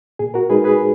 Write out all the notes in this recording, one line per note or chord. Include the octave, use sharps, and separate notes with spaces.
A#2 G#4
F#4 A#4
G#3 D#4 G#4 B4
G#4 B4